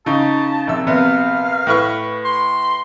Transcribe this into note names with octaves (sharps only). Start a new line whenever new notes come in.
C#3 D#4 A5
A#1 C3 E6
A#1 C3 B3 F5
A2 B4 C#6
C6